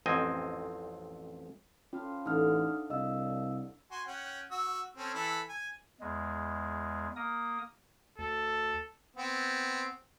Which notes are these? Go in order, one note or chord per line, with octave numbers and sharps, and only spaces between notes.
A1 F2 C4 D#5 G#5
C#4 F4 C5 F5 A5
A1 D3 D#4 D#6 F6
C2 D#5 F5 E6
F#4 G#5 C6
C#4 F#5 G5
F#4 E6
C4 C#4 A4
E3 A4 B5
G#5
E2 G#3
A#3 A#4 D#6
D2 A4
B3 C4